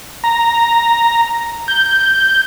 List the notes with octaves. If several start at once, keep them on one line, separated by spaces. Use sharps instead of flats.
A#5
G6